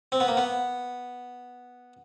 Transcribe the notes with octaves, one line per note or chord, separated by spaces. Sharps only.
C4
B3
A#3
B3